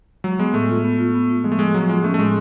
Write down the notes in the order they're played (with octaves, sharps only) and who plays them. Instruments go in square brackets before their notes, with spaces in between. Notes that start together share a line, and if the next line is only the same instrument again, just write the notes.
[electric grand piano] F#3 [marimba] G#3
[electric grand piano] G#3 [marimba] B3
[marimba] A2 [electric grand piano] A3
[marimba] F4
B3
F4
B3
F4
[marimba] F3 [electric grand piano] G#3
[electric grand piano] A3
[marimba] F3 [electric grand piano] G#3
[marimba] F3 [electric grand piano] F#3
[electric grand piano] G#3 [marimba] F4
[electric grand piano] A3 [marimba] C#4
[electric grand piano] A3
[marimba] A2 [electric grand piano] G#3